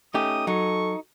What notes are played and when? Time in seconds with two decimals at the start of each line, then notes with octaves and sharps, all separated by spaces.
0.14 A3 C#4 D#4 G4 D#6
0.47 F#3 D#4 A4 C#6